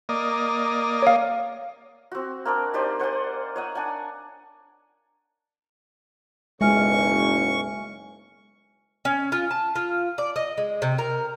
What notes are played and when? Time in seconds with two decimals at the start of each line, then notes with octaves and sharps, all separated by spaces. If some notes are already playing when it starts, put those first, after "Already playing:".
0.09 A#3 D5 D#5
1.02 C#5 F5
2.12 C4 F#4
2.45 A#3 C4 D4 D5
2.74 D#4 G4 C5 D5
2.99 C5 F#5 G#5 C6
3.56 C#5 D#5 F#5
3.75 D4 F#5 G#5
6.61 F#1 B1 G#3 E5 G#5 C#6 F6
9.05 C#4
9.32 F4
9.51 A5
9.76 F4
10.18 D5
10.36 D#5
10.58 G#3
10.82 C3
10.98 A#4